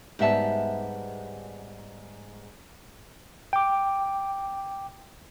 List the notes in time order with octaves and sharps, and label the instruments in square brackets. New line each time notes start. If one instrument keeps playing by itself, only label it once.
[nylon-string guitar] G#2 G3 B3 E5 A5
[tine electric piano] G5 D6